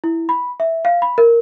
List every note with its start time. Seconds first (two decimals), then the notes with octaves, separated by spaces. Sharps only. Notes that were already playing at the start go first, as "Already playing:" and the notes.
0.04 E4
0.29 B5
0.60 E5
0.85 F5
1.02 B5
1.18 A#4